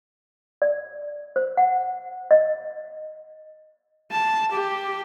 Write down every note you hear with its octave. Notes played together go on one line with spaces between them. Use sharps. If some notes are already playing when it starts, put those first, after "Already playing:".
D5
C5
F#5
D#5
A5
G4